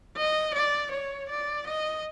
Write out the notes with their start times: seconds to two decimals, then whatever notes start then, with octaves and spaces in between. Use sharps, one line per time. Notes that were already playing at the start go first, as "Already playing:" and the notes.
0.17 D#5
0.55 D5
0.92 C#5
1.29 D5
1.67 D#5